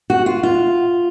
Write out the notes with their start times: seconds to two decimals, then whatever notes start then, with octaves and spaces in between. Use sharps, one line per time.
0.10 F#4
0.26 F4
0.43 F4